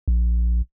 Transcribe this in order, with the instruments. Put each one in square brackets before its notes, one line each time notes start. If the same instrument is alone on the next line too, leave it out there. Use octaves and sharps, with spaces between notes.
[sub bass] A#1